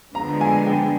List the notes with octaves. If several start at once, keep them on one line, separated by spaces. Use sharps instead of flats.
D2 D3 F3 G#3 B3 A#5
G#5
G5